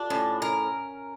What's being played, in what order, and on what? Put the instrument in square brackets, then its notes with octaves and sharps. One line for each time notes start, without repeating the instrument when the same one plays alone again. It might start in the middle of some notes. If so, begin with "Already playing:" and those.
Already playing: [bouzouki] D4 [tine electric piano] F4 G4 A4
[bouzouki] A2 [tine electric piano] C#4
[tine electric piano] C#4 [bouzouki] A#4